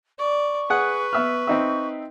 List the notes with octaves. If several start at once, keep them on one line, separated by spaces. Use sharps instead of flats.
D5 C#6
G#4 B4 F#5
B3 E5 F6
C4 D#4 E5